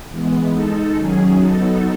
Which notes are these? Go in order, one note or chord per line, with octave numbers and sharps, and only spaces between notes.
E3 G#3 B3
G#3 D#4 A4
D#3 F#3 C#4 G#4
F#3 B3 D#4 A4